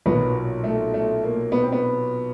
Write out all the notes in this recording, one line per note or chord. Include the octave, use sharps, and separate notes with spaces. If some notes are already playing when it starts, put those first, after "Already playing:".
B1 A#2 F#3 B3
A3
A3
A#3
B3
C4
B3